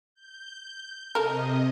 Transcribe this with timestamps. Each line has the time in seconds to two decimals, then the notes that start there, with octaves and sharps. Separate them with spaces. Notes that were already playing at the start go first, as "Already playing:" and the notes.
0.15 G6
1.15 C3 A4 A#4 D#5